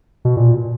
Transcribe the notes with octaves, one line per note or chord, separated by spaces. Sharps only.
B2
A#2